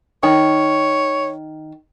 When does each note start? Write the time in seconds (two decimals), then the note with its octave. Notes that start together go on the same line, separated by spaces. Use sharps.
0.23 D#3 C#5